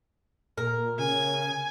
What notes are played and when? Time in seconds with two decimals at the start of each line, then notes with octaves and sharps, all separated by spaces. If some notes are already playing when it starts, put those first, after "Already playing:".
0.58 A#2 A#4
0.99 C#3 G#5